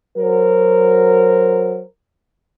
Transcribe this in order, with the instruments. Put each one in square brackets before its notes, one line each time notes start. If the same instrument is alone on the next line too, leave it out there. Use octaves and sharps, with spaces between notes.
[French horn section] F#3 A#4 C5